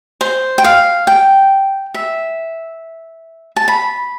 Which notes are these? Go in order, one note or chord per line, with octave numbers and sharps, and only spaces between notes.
C5
G5
F5
G5
E5
A5
B5